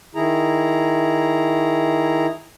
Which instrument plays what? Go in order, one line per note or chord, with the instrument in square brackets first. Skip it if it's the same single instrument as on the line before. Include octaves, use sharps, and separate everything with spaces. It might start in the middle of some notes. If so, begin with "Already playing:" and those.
[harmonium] D#3 E4 G#4 A#5